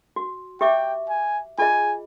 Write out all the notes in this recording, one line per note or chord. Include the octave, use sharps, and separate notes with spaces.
F#4
G4 E5 G5 D6
G#5
F4 G#4 D#5 G#5